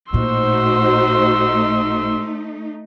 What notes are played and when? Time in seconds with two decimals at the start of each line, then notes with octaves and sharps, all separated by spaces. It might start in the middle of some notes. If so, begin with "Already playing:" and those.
0.13 A1 A#2 A3 D#4 F#4 C5 C6 E6